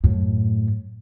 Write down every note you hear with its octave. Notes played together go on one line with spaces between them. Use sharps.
F#2 A2